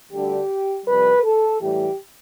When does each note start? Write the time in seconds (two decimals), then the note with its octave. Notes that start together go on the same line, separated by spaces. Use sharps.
0.12 D2 D3 G3 G4
0.86 F2 C3 G3 B4
1.23 A4
1.61 A2 E3 G3 G4